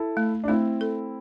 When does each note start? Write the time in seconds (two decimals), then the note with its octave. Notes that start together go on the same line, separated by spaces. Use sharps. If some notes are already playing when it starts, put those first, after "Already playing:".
Already playing: E4 A4
0.17 A3
0.44 D4
0.48 A3 C4 E4
0.81 A4